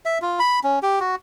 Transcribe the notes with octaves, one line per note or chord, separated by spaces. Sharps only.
E5
F4
B5
C#4
G4
F#4